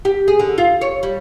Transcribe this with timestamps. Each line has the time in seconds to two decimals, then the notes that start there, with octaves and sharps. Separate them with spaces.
0.05 G4
0.28 G#4
0.40 D3
0.58 F4
0.81 C#5
1.03 G3